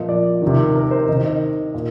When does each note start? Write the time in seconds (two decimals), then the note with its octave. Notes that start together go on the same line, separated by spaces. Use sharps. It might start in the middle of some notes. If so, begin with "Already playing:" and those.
Already playing: A#2 F3 D#5
0.09 D5
0.42 C3 D#3
0.76 A#4
0.91 C5
1.08 C3 D#3 D#5
1.25 D#5
1.74 A#2